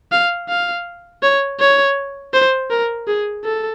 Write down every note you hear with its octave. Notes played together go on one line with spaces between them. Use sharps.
F5
F5
C#5
C#5
C5
A#4
G#4
A4